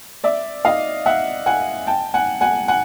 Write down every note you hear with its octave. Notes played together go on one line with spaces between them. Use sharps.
D5 E5
D#5 F5
E5 F#5
F#5 G#5
G5 A5
F#5 G#5
F#5 G#5
F#5 G#5